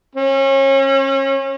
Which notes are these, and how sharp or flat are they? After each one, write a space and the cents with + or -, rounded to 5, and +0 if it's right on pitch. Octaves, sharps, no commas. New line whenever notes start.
C#4 -35